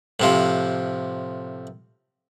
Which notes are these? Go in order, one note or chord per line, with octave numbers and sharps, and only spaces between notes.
A2 C3 F3